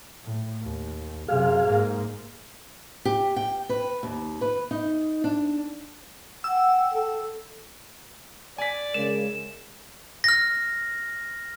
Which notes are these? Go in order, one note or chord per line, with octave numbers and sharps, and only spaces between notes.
A2
D#2
F#2 C3 G#4 F5
G#2 A#3
G4
G5
B4
D#2
B4
D#4
D4
F#5 G5 E6
A4
D5 G#5 B6
C#3 G#3 A#4 E7
F6 A#6